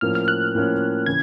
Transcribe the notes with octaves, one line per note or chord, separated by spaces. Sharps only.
A2 F3 A#3 C#4 F6
F6
F#6
A2 F3 A#3 C#4
C#3 E3 G#6